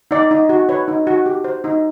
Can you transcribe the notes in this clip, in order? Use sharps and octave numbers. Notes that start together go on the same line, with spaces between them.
D#4 D5
D#4
F#4
B4 C#5
D#4
F#4
G4
C5
D#4